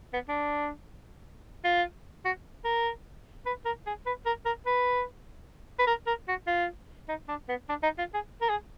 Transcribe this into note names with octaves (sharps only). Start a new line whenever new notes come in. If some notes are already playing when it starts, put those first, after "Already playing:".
B3
D4
F4
F#4
A#4
B4
A#4
G#4
B4
A#4
A#4
B4
B4
A#4
A#4
F#4
F4
D#4
D4
B3
D4
D#4
F4
G#4
A#4
G#4